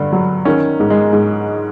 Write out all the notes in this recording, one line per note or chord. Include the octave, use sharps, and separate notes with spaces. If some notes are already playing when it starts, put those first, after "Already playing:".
Already playing: G2 D3
F#3
D#3 C#4
G#2
G#3
G#2